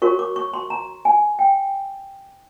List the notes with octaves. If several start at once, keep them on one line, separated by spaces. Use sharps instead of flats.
F#4 A#4 C#5 C#6
D6
C#6
C6
A#5
G#5
G5